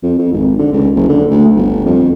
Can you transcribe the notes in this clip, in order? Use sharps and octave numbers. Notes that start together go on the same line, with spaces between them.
F2
F2
G#1
D3
C#2
F#1
D3
D2
G1
F2